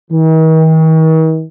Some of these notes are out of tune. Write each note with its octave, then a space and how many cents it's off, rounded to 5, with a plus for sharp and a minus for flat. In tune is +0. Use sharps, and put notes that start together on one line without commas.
D#3 +45